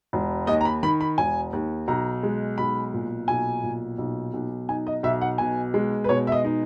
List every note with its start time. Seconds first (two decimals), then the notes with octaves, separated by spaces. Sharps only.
0.13 E1
0.47 D#2 D#5
0.61 A#5
0.65 B5
0.83 D#3 B5
1.01 B5
1.18 E1 G#5
1.53 D#2
1.88 B1 A#5
2.23 G#3
2.58 B1 B5
2.94 A#2
3.28 B1 G#5
3.63 A#2
3.98 B1
4.34 B1
4.69 D#4 G#5
4.87 D#5
5.03 B1 E5
5.21 F#5
5.38 B2 G#5
5.74 G#3
6.04 B4
6.09 B2 C#5
6.27 E5
6.32 D#5
6.45 D#4